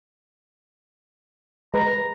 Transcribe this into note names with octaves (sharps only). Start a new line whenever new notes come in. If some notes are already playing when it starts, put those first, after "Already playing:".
G#3 A#4 B4 A#5